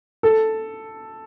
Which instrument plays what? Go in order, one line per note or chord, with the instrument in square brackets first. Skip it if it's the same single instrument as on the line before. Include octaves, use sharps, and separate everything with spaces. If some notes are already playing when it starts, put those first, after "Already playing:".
[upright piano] A4